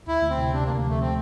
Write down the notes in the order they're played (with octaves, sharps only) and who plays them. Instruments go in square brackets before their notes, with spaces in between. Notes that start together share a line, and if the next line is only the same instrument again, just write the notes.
[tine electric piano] D2 [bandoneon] E4
[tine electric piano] D2
[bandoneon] C4
[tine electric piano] C3
[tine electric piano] C3 [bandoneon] D4
[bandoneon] A#3
[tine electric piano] D2
[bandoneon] A#3
[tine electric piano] F3 [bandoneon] A3
[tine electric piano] A3 [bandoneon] C4